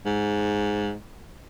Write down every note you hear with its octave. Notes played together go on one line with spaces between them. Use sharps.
G#2